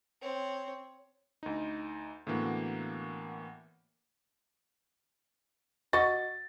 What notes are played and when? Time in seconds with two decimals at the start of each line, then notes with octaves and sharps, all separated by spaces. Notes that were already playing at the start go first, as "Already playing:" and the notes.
0.22 C4 C#5
1.43 D2 D#4
2.27 A2 D3 E3 A#3 B3 F#4
5.93 F#4 D#5 F#5 A6